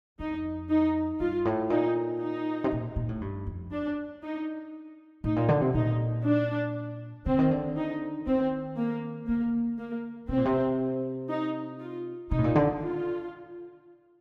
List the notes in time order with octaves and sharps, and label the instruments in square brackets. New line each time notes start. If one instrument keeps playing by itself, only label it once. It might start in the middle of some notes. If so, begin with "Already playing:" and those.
[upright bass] F2 [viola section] D#4
[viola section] D#4
[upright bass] G2 [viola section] F4
[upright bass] A2
[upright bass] A#2 [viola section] D#4
[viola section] D#4
[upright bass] C3
A#2
A#2
A2
G2
F2
[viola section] D4
D#4
[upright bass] A2 [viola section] D#4
[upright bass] A#2
D3
C3
[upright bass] A#2 [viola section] D#4
[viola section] D4
[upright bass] D3 [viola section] C4
[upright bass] D#3
D3
[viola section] D#4
[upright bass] D#3 [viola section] C4
[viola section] A#3
[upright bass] D3 [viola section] A#3
[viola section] A#3
[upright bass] C3 [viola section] C4
[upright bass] A#2
C3
[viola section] D#4
F4
[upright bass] C3 [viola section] D#4
[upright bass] A2
A#2
D3
[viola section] F4